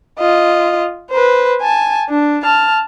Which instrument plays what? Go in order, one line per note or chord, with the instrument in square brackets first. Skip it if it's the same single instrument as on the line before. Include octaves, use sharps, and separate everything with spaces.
[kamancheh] F4 D#5
B4 C5
G#5 A5
D4
A5 F6